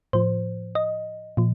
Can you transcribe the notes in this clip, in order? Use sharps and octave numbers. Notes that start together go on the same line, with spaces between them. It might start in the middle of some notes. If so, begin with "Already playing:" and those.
A2 F3 C5
D#5
A#2 F3